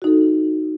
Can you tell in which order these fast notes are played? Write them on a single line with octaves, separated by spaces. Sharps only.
F#4 D#4 A4